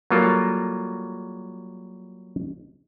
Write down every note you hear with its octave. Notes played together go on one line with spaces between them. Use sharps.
F#3 G3 A#3 F4 A4 A#4